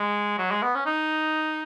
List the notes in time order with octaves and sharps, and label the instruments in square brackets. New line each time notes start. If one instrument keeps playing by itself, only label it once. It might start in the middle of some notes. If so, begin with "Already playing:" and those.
Already playing: [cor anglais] G#3
F#3
G#3
B3
C#4
D#4